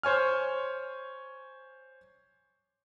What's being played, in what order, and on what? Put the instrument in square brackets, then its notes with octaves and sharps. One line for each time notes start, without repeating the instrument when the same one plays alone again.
[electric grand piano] C5 C#5 G#5 F6